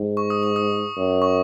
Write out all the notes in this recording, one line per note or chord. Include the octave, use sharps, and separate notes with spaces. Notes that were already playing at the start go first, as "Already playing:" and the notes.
Already playing: G#2
C#6
D#6
C#6
D#6
F#2
C#6